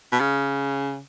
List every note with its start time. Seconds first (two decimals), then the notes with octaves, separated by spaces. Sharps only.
0.12 B2
0.20 C#3